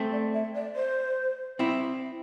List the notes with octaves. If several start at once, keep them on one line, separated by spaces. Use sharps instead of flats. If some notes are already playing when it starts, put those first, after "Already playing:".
Already playing: A3 C4
D5
E5
D5
C5
C4 E4